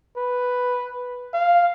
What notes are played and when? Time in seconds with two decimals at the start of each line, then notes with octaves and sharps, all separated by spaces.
0.16 B4
1.33 F5